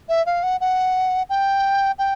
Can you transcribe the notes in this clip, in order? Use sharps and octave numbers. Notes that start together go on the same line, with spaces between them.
E5
F5
F#5
F#5
G5
G5